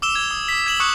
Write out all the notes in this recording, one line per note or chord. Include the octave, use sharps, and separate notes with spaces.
D6 E6 E7 G7
G#6
D#6
D6 B6
G#6 E7 F#7
C#6 D#6 F#6 C#7 F#7